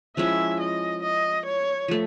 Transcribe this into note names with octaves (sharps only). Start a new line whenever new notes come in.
F3 G#3 C#4 E4 E5
D#5
D#5
C#5
F3 A3